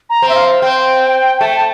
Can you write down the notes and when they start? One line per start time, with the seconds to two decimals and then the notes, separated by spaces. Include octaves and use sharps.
0.10 A#5
0.22 C4
0.29 E5
0.35 F5
0.62 C4 G5
1.40 A3 A5
1.48 G5
1.57 A5